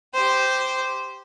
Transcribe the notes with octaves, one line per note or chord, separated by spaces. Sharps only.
G4 C5